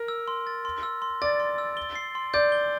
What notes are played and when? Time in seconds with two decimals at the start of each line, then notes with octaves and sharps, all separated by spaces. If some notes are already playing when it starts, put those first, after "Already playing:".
Already playing: A#4
0.08 E6
0.28 C6
0.47 A6
0.65 C6
0.83 E6
1.02 C6
1.22 D5 A6
1.40 C6
1.58 E6
1.77 G7
1.95 C7
2.15 C6
2.34 D5 G6
2.52 G7